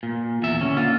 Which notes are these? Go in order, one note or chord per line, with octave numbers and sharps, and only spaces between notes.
A#2
E2 E5
D3 C#4
A#3 D4 F4 F#5